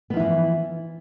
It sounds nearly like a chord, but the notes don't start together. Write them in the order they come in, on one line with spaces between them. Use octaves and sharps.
B3 F3 E4 E3